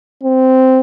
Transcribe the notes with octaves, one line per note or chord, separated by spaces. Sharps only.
C4